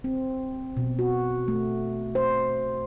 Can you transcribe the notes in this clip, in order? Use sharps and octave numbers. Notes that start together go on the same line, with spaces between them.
C4
B2
F#4
A3
C5